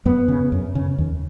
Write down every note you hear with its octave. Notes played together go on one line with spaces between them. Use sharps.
F#2 B3
C#3
F#2
C#3
D#2